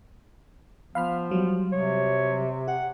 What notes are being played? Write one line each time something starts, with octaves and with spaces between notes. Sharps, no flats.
F3 B3 F5 B5 F6
F#3 G3
C3 C#5
G4 F#5